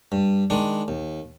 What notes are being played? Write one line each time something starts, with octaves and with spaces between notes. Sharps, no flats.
G2
D#3 G#3 D4
D#2